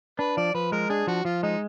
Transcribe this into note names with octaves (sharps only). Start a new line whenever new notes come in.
D4 B4
F3 D5
F3 B4
G#3 A#4
D4 G#4
F3 F#4
F3 F4
G#3 D#4